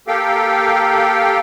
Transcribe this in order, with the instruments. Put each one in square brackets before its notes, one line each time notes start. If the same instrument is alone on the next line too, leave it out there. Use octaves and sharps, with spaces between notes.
[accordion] A#3 G4 A4 F5 G5